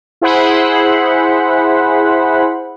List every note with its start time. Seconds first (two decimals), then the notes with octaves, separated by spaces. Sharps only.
0.21 E4 G#4 C5 F#5 B5